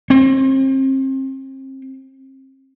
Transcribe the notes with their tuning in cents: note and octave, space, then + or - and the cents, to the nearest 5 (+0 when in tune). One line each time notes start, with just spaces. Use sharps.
C4 +35